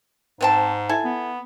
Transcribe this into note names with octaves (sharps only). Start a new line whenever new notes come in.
G#2 B3 C4 A5
E4 A4 G#5
B3